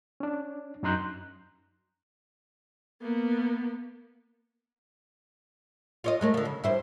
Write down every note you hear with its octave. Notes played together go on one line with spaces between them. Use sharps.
C#4 D4
F#2 D#4 A#5 C6 F#6 G6
A#3 B3
F4 C#5 D#5
G#3 A3 A#4
D3 F3
C#3
G2 E4 C5